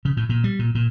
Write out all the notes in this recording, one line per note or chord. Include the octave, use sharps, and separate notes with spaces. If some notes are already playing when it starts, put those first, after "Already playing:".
C#3
A2
A#2
G3
A#2
A#2